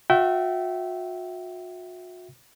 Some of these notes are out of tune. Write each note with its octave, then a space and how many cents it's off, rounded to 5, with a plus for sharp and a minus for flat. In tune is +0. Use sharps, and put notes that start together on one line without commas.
F#4 -40 E5 +0 G5 -30